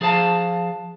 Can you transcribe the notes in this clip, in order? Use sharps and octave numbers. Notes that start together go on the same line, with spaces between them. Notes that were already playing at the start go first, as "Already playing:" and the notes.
F3 G#4 C5 F5 A5